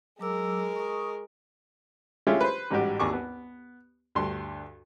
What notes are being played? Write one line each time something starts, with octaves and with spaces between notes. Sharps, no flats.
F#3 G#3 A#4 D6 E6
C#6 D#6
G#3 A3 C#4 E4 F4 G4
B4 C5
A1 G#2 G3 F#4 G4
G#1 D#2 G#4 C#6 D6
B3
D2 G2 C6